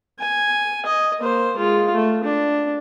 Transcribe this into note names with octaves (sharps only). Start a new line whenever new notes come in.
G#5
D#5
A#3 C5
G#3 F4
A3
D4